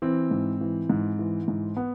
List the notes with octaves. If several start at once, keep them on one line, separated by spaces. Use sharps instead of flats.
E3 C4
G#2
E3
G#2
E3
G#2
B3